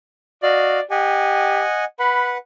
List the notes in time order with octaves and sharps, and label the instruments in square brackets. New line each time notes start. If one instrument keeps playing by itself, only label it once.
[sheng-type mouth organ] F#4 D#5 F5 [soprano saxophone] D5
[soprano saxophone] G4 [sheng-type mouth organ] D#5 F#5 G#5
[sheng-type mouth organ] B4 F#5 [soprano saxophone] B5